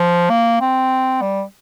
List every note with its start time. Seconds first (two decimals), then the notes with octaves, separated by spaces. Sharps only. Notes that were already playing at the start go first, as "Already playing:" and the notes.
Already playing: F3
0.30 A#3
0.61 C4
1.21 G3